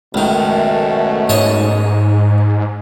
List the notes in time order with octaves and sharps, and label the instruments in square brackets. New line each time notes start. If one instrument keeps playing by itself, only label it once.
[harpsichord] C#2 D#3 [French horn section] F#2 B2 A3
[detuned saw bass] G#2 [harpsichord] C#5 D#5 A5